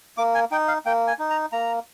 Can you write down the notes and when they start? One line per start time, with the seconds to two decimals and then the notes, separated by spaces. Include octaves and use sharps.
0.17 A#3 D6
0.34 G#5
0.51 D#4 G5
0.68 F5
0.86 A#3 G5
1.07 G#5
1.19 D#4
1.30 A#5
1.52 A#3 A#5